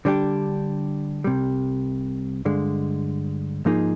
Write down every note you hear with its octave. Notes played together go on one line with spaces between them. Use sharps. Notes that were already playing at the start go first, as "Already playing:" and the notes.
D3 G3 D4 G4
C2 C3 G3
G2 D3 G#3
G#2 F3 A#3 D#4 G#4